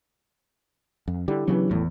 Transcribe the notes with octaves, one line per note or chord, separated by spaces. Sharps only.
F2
D3 G3 D4 E4 G4
C#3 E3 F#3 B3
G#1 E2 A2